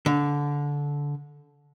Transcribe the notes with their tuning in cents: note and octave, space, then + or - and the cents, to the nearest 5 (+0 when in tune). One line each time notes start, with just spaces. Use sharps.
D3 -20